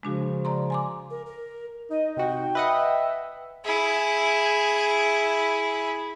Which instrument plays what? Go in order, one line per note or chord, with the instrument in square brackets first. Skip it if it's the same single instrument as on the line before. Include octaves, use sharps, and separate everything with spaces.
[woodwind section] C#3 F3 [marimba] G#3 D4 F#4
[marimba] D5 A#5 C6
G#5 C6 D6
[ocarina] A#4
A#4
[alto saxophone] D#4 [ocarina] D#5
[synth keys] C3 F#4 [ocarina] G5
[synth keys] B4 D#5 F#5 [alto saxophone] E5
[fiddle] E4 G#4